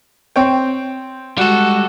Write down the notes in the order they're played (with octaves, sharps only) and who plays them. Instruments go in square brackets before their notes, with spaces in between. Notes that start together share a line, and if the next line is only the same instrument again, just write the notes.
[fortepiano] C4 C#5 G5
[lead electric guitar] G3 A4 [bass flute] G#3 [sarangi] F#4